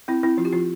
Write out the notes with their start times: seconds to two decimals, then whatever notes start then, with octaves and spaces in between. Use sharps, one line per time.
0.08 C4 E4
0.23 C4 E4
0.37 F3 F4
0.45 G4
0.53 F3 F4